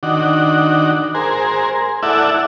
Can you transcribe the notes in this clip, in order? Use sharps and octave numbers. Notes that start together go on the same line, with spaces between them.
D#3 D4 F#4
G#4 A#4 C5
E4 A4 D5 E5 F#5